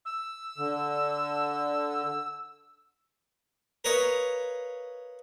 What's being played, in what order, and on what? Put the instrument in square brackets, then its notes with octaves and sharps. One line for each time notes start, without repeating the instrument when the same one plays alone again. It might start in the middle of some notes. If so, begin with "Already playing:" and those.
[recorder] E6
[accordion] D3
[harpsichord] A#4 B4 C#5 D#5 F5